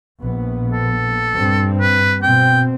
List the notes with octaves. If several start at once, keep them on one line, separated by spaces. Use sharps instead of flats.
A#1 B3
A4
G2 C4
B4
B2 C4 G5